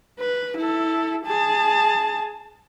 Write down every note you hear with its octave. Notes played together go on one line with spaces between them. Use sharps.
B4
E4 A4
G#4 A5